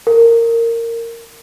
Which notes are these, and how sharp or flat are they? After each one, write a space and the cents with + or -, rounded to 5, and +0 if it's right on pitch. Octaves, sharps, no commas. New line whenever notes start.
A#4 -15